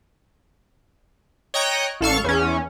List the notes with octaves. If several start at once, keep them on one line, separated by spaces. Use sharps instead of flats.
C#5 D#5 G5 A#5 F#6
A1 A4 F5 C#6
E2 C#4